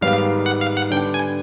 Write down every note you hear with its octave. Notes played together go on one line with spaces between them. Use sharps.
G#2 D#3 G3 B3 F5
F#5
F5
F#5
D3 G3 B3 D4 G5
G#5